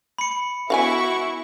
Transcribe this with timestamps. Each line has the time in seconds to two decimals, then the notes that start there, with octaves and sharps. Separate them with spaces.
0.18 B5 C#7
0.70 B3 E4 F#4 F5 F#5 G#5 C#6